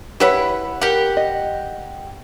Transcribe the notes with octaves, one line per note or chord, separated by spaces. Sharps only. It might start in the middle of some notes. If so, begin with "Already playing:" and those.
E4 G4 B4 C#5 F#5 B5
G4 A#4 F#5
D#5